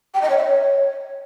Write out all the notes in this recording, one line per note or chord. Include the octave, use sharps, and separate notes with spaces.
G5
D#5
C#5
E5
C#5